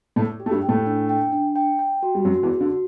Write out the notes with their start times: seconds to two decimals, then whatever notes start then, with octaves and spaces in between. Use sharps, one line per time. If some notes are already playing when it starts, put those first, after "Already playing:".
0.16 A2 A3 D5
0.40 G4
0.46 A3
0.51 G2 G3
0.63 G5
0.68 A2 A3
0.86 D4
1.09 G5
1.32 D4
1.56 G5
1.79 G5
2.03 F#4
2.15 G3
2.25 F#2 F#3 F#4
2.43 E2 E3
2.48 F#4
2.61 D3
2.72 F#4